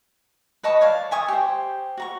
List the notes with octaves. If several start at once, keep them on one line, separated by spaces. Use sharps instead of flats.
B4 D#5 A5 C#6
C#5 D5 F5
E5 G#5 C#6 D#6
G4 C5
F#4 A#5 C#6